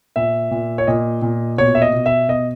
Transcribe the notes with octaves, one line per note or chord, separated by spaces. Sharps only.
A#2 E5
A#2
C#5
A#2 D#5
A#2
B2 C#5
E5
D#5
B2
E5
B2 D#5